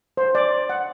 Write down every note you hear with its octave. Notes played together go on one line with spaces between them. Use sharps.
C5
D5
F#5